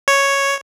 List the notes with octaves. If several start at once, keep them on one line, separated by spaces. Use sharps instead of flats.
C#5